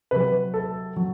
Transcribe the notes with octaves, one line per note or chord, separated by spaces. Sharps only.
C3 F#3 B4
A4
F#3